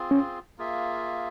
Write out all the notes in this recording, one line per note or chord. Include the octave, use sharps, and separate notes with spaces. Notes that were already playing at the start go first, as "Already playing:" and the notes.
Already playing: C4 F4 G#4
C#4
A#3 F4 G#4 E5